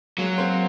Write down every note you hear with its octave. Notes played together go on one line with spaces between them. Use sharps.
F#3 G#3 A#3
A#3 C4